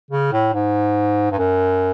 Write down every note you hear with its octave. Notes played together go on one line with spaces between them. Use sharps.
C#3
A2
G#2
G2
F#2